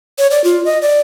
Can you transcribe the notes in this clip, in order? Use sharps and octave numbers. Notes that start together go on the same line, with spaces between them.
C#5
D5
F4
D#5
D5